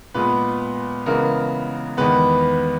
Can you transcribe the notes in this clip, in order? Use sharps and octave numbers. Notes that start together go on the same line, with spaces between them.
A#2 G#3 B3 B4
C#3 E3 G#3 B3 A#4
E2 D#3 G#3 B3 B4